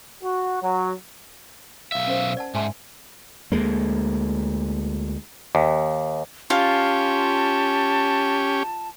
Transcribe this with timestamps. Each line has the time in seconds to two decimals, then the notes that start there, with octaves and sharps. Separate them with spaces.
0.23 F#4
0.62 F#3
1.92 B1 E5 F5
2.07 C#4 A#4 C5
2.37 D5 F#5 A5
2.55 G#2 E5 G#5 A5 C6
3.52 D2 G#3 A#3
5.55 D#2
6.50 C#4 F4 G4 A5